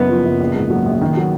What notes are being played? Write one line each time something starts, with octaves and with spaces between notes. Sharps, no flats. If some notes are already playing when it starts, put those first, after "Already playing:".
Already playing: F#1 F#2 B3
F3
F#1
A#1
G#2
F#3
A#1
D#3
F#3